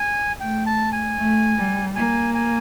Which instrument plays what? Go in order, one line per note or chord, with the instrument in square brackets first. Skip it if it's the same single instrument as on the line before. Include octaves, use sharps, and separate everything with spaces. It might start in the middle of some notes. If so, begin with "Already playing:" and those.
Already playing: [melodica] G#5
[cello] A3 [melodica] G5
[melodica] A5
G#5
[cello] A3
G3
[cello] A#3 [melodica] G#5
[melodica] G#5